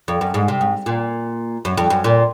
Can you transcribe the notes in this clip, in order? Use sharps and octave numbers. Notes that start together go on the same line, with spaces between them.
F2
F#2
G#2
C3
G#2
A#2
F#2
F2
F#2
A#2